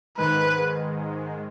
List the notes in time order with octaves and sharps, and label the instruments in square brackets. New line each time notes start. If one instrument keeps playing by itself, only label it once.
[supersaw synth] G#2 D#3 G#3 [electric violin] B4